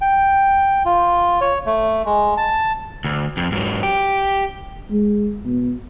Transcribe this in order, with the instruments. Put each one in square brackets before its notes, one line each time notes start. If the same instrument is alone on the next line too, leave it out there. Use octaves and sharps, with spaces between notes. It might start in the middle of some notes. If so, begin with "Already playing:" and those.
[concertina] G5
F4
C#5
A3
G#3
A5
[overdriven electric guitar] D2
F2
G#2 F#3
G4
[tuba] G#3
B2